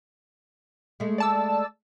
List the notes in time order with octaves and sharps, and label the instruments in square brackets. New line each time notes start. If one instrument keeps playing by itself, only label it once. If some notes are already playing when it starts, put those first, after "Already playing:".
[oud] G#3 A3
[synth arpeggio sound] D5 A5 E6